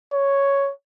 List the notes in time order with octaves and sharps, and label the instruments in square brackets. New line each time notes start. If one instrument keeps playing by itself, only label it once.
[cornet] C#5